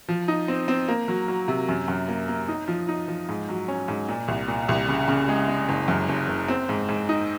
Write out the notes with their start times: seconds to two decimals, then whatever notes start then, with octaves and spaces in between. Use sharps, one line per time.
0.09 F3
0.28 D#4
0.48 C4
0.68 C4
0.88 A#3
1.08 F#3
1.28 F#3
1.48 C3
1.69 F#2
1.88 F#2
2.08 A#3
2.28 A#3
2.48 D#4
2.68 F3
2.88 D#4
3.08 F3
3.29 G#2
3.49 F#3
3.68 C#4
3.88 G#2
4.09 A#2
4.28 C2
4.48 A#2
4.69 C2
4.88 C#3
5.08 C#3
5.28 G#3
5.48 G#3
5.69 F#1
5.88 F#2
6.08 F#1
6.28 F#1
6.48 C4
6.69 G#2
6.89 G#2
7.09 D#4